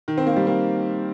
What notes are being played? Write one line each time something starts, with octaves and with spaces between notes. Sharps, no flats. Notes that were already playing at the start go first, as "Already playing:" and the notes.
D#3
C4
A#3
G3
A#3